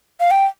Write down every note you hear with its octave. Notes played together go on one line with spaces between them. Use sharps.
F5
G5